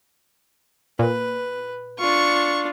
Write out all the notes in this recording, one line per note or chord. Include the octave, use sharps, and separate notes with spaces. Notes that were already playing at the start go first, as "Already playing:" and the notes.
A#2 B4
D4 F4 C#6